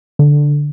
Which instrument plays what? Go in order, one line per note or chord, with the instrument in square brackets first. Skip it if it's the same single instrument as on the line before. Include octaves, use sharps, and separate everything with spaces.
[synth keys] D3